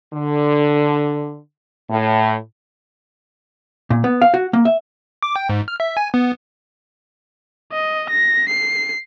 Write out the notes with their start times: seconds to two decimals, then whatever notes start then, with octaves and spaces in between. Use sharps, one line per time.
0.14 D3
1.90 A2
3.90 A#2
4.04 B3
4.22 F5
4.34 F#4
4.53 A#3
4.65 E5
5.23 D6
5.36 G5
5.49 G#2
5.68 F6
5.80 E5
5.97 G#5
6.14 B3
7.72 D#5
8.10 A#6
8.49 C7